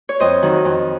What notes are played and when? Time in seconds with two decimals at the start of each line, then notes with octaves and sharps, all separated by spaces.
0.09 C#5
0.20 F2 C5 D#5
0.42 D#3 F#3
0.65 F2